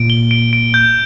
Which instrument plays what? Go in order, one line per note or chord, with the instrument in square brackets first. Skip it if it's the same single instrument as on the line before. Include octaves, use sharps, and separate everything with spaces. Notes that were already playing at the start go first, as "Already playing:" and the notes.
Already playing: [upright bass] A#2 [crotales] D7
[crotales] G7
D7
D7
G6